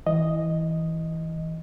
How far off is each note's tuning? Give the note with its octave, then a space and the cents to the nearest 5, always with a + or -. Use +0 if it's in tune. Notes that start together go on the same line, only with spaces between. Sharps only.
E3 -15 D#5 +0